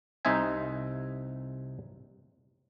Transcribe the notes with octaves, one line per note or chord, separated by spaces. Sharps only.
C2 C3 D#4 C5 E5 G#5